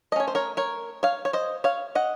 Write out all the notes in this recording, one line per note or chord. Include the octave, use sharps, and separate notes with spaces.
A3 C#4 C#5 D#5
C5
A#4 C#5
A#4 C#5
C#5 F5
C#5
C5 D#5
C#5 F5
D#5 F#5